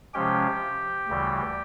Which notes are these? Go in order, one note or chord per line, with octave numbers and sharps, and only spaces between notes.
C3 F3 G#3 C#4 G4 G5
D2 C#3 E3 G3